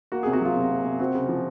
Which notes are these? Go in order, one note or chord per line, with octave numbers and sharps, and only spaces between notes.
A#3 F#4
C3 G#4
F#4
F#3 F4
C3
A#3
C3
C4 F#4
C#3
F3